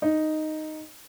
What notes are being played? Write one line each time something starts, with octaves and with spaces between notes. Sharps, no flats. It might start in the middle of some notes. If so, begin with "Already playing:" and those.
D#4